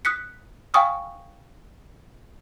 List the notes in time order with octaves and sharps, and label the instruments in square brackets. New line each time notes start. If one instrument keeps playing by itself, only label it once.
[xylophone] D#6 F#6 B6 C#7
F5 G5 G#5 C#6 D#6 F6